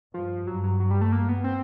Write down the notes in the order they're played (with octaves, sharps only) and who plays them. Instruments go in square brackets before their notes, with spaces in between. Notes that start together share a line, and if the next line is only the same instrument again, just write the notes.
[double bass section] G2 [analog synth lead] F3
[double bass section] G2 [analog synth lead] F#3
[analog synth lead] F#3
F#3
G3
A3
A#3
B3
C4